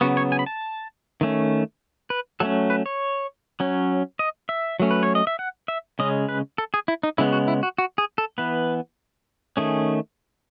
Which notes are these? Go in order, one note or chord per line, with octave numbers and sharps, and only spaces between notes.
C#3 F#3 B3 F#4
C#5
G#5
B5
A5
D#3 A3 C#4
B4
F#3 A3 C#4 A4
B4
C#5
F#3 C#4
D#5
E5
F#3 A3 C#4
B4
C#5
D#5
E5
F#5
E5
C#3 G#3 C#4 D#5
B4
A4
G#4
E4
D#4
C#3 G#3 B3 E4
F#4
E4
F#4
F#4
G#4
A4
E3 B3 B4
D#3 A3 C#4 G#4